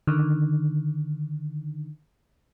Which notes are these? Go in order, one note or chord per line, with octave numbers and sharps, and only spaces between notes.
D3 D#3